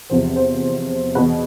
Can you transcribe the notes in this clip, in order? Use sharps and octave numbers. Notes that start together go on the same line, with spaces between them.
E2 C3 F3 C5
C5
E2 B2 B4